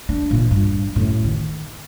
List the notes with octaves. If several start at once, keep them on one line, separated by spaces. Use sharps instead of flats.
D4
A#2 E3
G2
F#2 A2
D#3